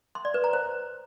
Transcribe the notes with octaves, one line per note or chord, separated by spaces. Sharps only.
C6
D5
B4
A#5
C5